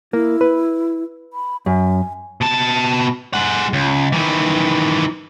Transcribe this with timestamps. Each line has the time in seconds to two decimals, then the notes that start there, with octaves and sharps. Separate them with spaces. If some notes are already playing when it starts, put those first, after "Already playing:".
0.13 A#3 E4
0.41 B4
1.33 B5
1.66 F#2 G#5
2.41 B2 A5
3.34 G#3 F#5
3.73 C#2
4.12 D#3 E3